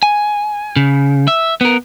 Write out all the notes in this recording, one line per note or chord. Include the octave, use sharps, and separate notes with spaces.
G#5
C#3
E5
B3 A#4